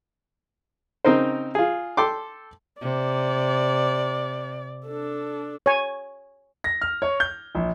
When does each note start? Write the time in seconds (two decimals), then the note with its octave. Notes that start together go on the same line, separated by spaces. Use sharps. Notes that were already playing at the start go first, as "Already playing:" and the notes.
1.05 C#3 C4 D#4 A#4 C5
1.55 F4 G#4
1.97 A4 G5 C6 D6
2.82 C3 D5
4.85 D4 A4
5.66 C#5 G#5
6.64 A#6
6.81 F6
7.02 C#5
7.20 G6
7.55 A#1